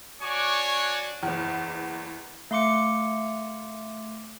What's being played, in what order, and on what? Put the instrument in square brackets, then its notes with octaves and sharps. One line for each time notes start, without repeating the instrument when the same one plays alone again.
[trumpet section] D4 F#4 C#5 G#5 C#6 D6
[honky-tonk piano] F#1 E2
[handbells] A3 F5 C6 D6 C#7